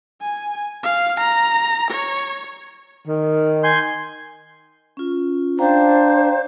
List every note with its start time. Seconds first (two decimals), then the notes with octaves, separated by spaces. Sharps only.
0.21 G#5
0.84 F5
1.20 A#5
1.91 C#5
3.08 D#3
3.64 G#5 C6 G6
4.97 C#4 F4
5.59 D4 C5 F5 G5 A#5